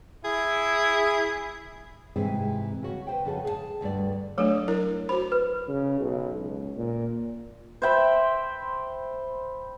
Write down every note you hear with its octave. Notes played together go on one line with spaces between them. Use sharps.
E4 G#4
G#2 C3 E3 C4 G#4
C#3 F#4
B4 C5 G5
F2 C#3 F#4 G#4 A4
G#4 F5 A5
D2 G2 D5
F#3 A3 D4 A4 C#5
E4 A#4
F#4 C5 B5
B4
C#3
B1
C#2
A#2
C5 E5 G5 B5